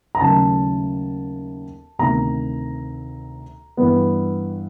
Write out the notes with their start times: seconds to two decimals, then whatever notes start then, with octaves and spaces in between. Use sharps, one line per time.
0.15 A#5
0.21 D#2 C#3 F#3 A3 A5
1.99 D2 C3 D#3 A#5
3.77 G2 E3 G3 B3